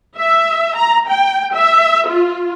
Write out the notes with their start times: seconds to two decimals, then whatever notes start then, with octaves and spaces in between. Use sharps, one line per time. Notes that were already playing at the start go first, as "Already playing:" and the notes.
0.17 E5
0.77 A#5
1.08 G5
1.54 E5
2.08 F4